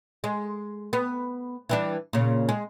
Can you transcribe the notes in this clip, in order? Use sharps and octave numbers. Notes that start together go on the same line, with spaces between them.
G#3
B3
E3 G3 D4
A#2 C#3
G#3